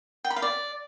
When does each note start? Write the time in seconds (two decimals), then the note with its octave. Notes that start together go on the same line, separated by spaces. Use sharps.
0.24 G5
0.30 B5
0.36 F5
0.42 D5